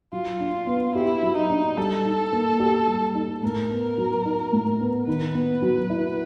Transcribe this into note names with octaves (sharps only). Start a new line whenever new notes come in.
F#3 F4
D4
B3
E4 G4
F#3
D#4
D4
G3 A4
D#4
A#3
G4
G3
D#4
A2 A#4
B3
F#3
D#4
A2
B3
D#3 B4
B3
F#3
E4